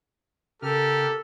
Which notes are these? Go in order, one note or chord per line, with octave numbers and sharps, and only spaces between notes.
C#3 G4 A4 A#4 F6